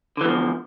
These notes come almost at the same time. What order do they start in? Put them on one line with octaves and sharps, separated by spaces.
D3 E3 E2 F3